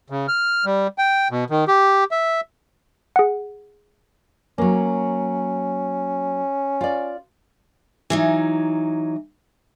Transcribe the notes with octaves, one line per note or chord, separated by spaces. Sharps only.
C#3
F6
G3
G5
B2
D#3
G4
E5
G#4 F#5
F#3 A#3 C#4
F4 D5
E3 F#3 D#4